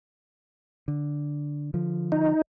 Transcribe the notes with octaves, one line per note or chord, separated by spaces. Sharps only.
D3
D3 F3
D#4